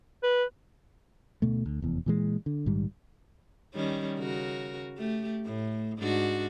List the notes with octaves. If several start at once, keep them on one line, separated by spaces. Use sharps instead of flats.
B4
D2 B2 A3
D2
F1 E2
A#2 E3 G#3
D3
A#1 G#2 D#3 G3
D#3 G3 C#4
C#3 F#4 A#4
A3 G4
A2
G#2 D4 F#4